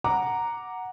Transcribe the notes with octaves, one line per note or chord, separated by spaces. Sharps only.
F#5 A#5 D6